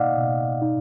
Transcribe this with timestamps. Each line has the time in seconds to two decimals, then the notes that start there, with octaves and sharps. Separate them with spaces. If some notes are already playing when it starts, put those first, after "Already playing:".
Already playing: B2 A#3 D#4 D5 D#5 F5 F#5
0.18 B2
0.62 D#4